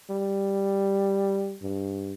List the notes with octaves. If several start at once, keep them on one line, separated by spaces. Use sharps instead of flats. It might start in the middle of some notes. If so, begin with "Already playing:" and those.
G3
G2